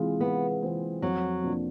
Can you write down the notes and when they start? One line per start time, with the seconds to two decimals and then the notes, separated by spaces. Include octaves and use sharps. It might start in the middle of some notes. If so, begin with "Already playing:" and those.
Already playing: C3 E3 G#3 C4 F4
0.20 C3 B3
0.61 E3 G#3 C4 F4
1.02 F2 F#3
1.43 C3 F3 A#3 D4